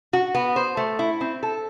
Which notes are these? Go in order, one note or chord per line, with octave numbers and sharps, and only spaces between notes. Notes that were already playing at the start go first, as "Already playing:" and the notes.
F#4
B3
C5
A3
E4
C4
A4